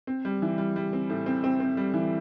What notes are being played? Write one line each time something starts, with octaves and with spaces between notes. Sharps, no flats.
C4
G3
E3
G3
G3
C4
A2
C4
C4
C4
G3
E3